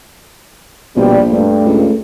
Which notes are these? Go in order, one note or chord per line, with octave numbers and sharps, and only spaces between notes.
A#1 B2 G3 C4
G2 A3
C#2